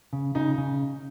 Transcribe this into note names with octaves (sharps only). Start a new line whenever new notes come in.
C#3
C#3 D#4
C#3